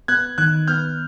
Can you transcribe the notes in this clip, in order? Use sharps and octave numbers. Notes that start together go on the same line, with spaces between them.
B3 F#6 G#6
D#3 F#6 G#6
B3 F6 G6